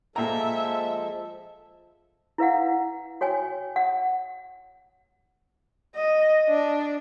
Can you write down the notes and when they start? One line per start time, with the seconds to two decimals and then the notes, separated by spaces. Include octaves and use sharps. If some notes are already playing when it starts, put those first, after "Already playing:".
0.16 A#2 F3 G#3 A4 E5 G5 A#5
2.38 E4 B4 F5 F#5
3.21 F#4 C#5 G5 G#5
3.76 F#5
5.95 D#5
6.48 D4